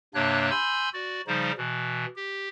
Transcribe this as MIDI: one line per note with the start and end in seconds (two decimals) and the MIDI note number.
0.14 0.50 43
0.14 0.50 48
0.14 0.50 58
0.14 0.50 62
0.14 0.50 73
0.14 0.50 90
0.51 0.89 80
0.51 0.89 83
0.51 0.89 84
0.51 0.89 88
0.51 0.89 91
0.93 1.21 66
0.93 1.21 74
1.27 1.52 49
1.27 1.52 53
1.27 1.52 55
1.27 1.52 63
1.27 1.52 72
1.58 2.06 47
1.58 2.06 52
2.16 2.49 67